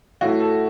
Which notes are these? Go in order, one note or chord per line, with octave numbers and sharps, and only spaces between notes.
A2 A3 F#4
A4